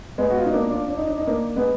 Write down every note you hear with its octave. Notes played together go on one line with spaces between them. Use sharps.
G#3 B3
F#4
F4
D#4
A#3 D4
D4 F4
D4
D#4
D4
D#4
A#3 D4
G#3 B3